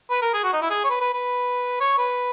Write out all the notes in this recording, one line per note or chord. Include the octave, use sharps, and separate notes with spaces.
B4
A#4
G#4
F#4
D#4
E4
G#4
C#5
B4
B4
B4
C#5
B4